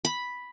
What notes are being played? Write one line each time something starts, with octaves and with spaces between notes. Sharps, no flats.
B5